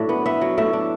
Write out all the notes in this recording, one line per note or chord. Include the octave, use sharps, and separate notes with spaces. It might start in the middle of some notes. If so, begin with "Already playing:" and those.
Already playing: A2 F#3 D4 E5
B3
B3 E5
F#3
A2 E5
D4